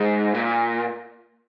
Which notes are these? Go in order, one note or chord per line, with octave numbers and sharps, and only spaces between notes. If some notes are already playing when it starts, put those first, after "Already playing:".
Already playing: G#2
A#2